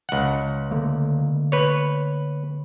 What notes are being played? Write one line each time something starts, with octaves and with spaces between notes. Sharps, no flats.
C#2 F#5
D3 A3 A#3
B4 C#5